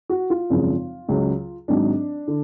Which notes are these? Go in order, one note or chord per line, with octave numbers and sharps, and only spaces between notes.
F#4
F4
G#1 F#2 C#3 F3
C#2 C#3 F#3
G#1 G#2 F#3 D4
D3